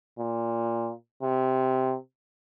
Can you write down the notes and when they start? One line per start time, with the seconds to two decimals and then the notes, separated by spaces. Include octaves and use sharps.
0.19 A#2
1.23 C3